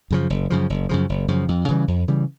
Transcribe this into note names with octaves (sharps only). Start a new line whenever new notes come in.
F#2 C#3 F3
F#1
F#2 C#3 F3
F#1
F#2 C#3 F3
F#1
F#2 C#3 F3
F2
C#3 E3 G3
F2
C#3 E3 G3